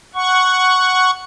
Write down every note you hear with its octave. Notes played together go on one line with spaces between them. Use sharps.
F#5 C#6